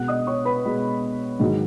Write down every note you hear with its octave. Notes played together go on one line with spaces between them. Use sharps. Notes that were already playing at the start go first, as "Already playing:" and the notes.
Already playing: B2 G#3 B3 F#5 F#6
D#5 D#6
C#5 C#6
B4 B5
B2 G#3 B3
G#2 D#3 F#3